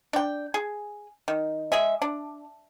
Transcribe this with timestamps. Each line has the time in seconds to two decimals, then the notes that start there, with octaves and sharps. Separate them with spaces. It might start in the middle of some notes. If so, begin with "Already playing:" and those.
0.13 D4 G5
0.54 G#4
1.28 D#3
1.72 G#3 G#4 E5
2.02 D4